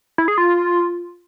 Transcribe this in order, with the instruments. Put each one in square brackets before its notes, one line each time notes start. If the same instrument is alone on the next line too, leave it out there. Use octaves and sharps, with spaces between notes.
[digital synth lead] E4
G#4
F4